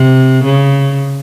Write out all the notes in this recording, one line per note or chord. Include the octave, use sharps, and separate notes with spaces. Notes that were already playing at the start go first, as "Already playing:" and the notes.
Already playing: C3
C#3